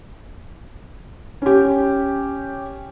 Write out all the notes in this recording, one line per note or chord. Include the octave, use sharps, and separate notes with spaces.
C#4 G4